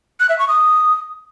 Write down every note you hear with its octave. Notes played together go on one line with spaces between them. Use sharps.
F#6
E5
C#6
D#6